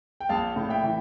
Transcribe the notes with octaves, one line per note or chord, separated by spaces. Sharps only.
G5
A#1 F5 A5
A2
E5 G5
E3